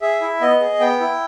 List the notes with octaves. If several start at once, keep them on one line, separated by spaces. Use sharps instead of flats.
G#4 E5
E4
B3 D#5
G#4
B3 G5
E4